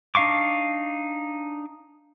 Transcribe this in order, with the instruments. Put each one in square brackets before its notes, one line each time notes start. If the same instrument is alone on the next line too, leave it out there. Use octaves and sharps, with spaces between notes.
[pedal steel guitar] D4 D#4 F5 C#6 D6